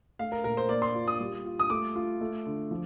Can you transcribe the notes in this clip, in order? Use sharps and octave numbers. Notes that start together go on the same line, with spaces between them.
A3 F5
A#4
A#2 A#4
C5
A#3 D5
C6
F4
D#6
G3
F4
D#6
A3 D6
F4
A3
D3
F3